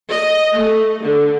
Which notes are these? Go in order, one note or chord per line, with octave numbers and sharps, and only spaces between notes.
D#5
A3
D3